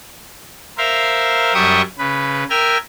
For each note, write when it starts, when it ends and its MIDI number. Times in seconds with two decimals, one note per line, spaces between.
0.78 1.54 70
0.78 1.54 72
0.78 1.54 76
0.78 1.54 77
1.54 1.81 42
1.54 1.81 55
1.54 1.81 76
1.54 1.81 79
1.54 1.81 85
1.54 1.81 87
1.98 2.44 49
1.98 2.44 71
2.50 2.77 70
2.50 2.77 76
2.50 2.77 79
2.50 2.77 80
2.50 2.77 89